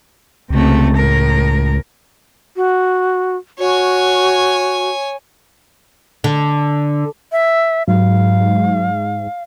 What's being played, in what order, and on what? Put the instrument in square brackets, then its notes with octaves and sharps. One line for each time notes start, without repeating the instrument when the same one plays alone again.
[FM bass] C#2 [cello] C3 A3
[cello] A2 A#4
[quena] F#4
[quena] F#4 [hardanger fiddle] C#5 G#5
[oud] D3
[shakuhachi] E5
[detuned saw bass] G#2 [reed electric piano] F#3 [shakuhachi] F5